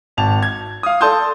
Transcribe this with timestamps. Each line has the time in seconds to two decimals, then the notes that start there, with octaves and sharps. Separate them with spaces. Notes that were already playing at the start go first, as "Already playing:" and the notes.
0.17 G#1 A5 F7
0.43 G#6
0.83 F5 D#6
1.01 A4 D5 A5 C6 D#6 G6